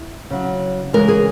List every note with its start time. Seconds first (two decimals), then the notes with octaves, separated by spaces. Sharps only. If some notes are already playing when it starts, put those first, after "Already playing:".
Already playing: E4
0.30 C#3 F#3
0.93 C#3 E3 G#3 A#4
1.08 G#4